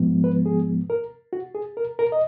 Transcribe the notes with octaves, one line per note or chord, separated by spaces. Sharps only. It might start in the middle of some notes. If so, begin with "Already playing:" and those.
Already playing: G#2 F3 G#3 B3
B4
G#4
A#4
F#4
G#4
A#4
A#4
D#5